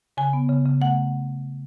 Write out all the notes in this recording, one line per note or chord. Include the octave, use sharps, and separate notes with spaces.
C#3 G#5
B3
C#3
C#3
A3 F#5